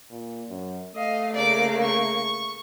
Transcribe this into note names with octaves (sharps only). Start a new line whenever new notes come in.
A#2
F#2
A3 D#5 F5
C#3 A#3 D5 D6
C#6